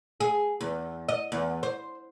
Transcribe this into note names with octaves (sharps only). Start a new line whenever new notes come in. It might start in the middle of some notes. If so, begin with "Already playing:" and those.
G#4
E2
D#5
E2
C5